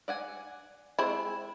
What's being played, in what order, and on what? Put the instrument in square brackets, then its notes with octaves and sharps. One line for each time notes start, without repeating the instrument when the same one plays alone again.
[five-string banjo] D5 F#5 G#5
[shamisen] G#3 E4 [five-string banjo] C4